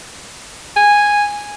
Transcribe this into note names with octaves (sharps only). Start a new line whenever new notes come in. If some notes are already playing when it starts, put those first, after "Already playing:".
G#5